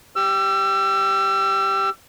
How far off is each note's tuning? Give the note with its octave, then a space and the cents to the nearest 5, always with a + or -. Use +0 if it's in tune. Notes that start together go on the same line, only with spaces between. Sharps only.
G4 -5 E6 +35